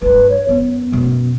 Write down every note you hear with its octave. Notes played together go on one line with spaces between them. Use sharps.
G2 F4 B4
C#5
F#2 B3
F#2 B2